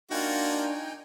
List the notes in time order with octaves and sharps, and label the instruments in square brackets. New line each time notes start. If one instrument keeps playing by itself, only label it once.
[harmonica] A#3 F4 F#4 [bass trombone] D4 [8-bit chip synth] D#4 G5 G#5